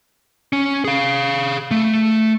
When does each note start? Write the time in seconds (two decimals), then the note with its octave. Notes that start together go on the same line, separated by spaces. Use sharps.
0.53 C#4
0.84 G#4 F5
1.71 A3